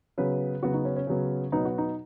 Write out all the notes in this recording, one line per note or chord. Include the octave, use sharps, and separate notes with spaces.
C#3 F#3 B3 B4
C#3 F#3 B3 F#4
D#4
C#4
C#4
C#3 F#3 B3
B2 F#3 B3 D#4
F#4
D#4